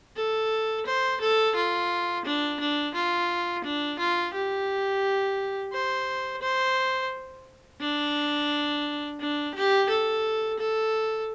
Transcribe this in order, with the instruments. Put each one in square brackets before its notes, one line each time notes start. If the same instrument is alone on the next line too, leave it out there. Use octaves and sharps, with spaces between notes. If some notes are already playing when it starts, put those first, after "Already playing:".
[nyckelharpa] A4
C5
A4
F4
D4
D4
F4
D4
F4
G4
C5
C5
D4
D4
G4
A4
A4